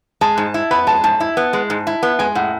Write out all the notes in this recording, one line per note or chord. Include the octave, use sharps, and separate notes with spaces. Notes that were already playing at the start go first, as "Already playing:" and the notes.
G#3 A5
G#2
E4
B3 B5
G#3 A5
G#2 A5
E4
B3
G#3
G#2
E4
B3
G#3 G#5
A2 F#5